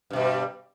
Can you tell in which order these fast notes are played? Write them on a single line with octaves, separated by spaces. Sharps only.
G2 B2 G3